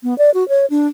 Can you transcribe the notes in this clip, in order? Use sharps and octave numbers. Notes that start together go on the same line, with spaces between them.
B3
D5
F#4
C#5
D4